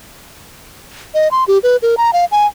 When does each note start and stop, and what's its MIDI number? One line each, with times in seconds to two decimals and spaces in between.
1.14 1.28 75
1.31 1.44 84
1.48 1.58 67
1.63 1.77 71
1.82 1.95 70
1.97 2.11 82
2.13 2.25 77
2.32 2.46 80